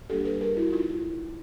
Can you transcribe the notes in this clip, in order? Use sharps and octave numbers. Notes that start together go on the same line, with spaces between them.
G3 A#3 D4 G4 A4
A4 B4
G#4 A#4
E4 F#4
D#4 F4